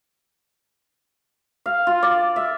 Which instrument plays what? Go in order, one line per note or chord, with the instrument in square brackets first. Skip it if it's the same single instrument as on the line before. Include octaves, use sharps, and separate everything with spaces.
[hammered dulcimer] F5
F4
D5
E5